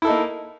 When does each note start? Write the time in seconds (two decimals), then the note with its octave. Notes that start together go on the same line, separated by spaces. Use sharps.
0.02 E4
0.05 A4
0.07 D#4
0.10 A#3